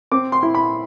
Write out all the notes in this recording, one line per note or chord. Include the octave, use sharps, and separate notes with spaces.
C4 D6
C6
E4
B5